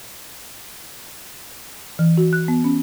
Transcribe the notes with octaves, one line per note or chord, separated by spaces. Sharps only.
E3
F#4
F#6
B3
C#4